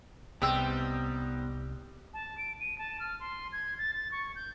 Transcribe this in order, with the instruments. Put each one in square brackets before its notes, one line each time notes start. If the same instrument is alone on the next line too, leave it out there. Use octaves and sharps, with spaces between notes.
[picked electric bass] C2 C3 [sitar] G3 [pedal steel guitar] B3 C4 D#4 [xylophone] G5 E6
[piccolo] A5
D7
D#7
A5
F6
C6
G#6
A6
A6
C#6
G6